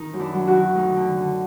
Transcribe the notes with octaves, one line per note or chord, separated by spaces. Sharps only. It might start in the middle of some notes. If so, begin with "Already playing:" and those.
Already playing: D#3 D#4
F#2
D4 E4
F#3
E4 F#4
D#3
D2 D#4
D3
D3